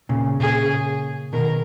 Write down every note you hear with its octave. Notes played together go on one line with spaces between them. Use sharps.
A#2 C#3
A#2 C#3 G#4
B2 D#3 A#4